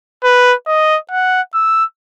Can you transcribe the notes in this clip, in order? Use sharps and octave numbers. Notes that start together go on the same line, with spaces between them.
B4
D#5
F#5
E6